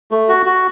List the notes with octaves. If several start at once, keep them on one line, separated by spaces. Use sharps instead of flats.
A3
F#4
F#4